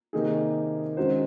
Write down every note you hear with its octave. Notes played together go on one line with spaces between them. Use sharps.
C3 D#3 A#3 D#4 G#4
D#3 G#3 C#4 F#4 C5